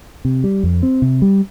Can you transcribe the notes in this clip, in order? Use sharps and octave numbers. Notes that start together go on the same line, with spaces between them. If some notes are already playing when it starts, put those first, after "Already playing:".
C3
G3
F2
C4
C3
G3